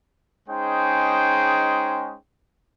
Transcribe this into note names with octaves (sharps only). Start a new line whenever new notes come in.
G#3 C#4 D#4 G#4 C5 G5